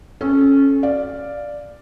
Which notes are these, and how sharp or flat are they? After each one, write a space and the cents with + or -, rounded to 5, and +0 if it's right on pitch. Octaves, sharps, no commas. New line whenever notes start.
C#4 -10 A4 -30
D5 +0 F5 +0